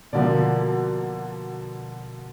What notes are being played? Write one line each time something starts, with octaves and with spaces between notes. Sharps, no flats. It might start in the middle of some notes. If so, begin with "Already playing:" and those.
B2 D3 F3 A#3 D5